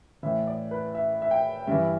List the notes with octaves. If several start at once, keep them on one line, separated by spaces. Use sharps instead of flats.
A2 E3 E5
D5
B4
E5
E5
G5
G2 E3 E5